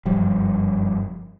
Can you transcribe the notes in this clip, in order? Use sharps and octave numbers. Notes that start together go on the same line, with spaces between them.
F#1 G2 F3 G3